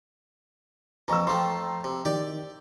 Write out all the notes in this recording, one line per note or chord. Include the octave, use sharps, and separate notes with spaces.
F2 E3 A#5 C#6 E6
F3 A3 G5 A#5 C6
C3
D#3 G4 D5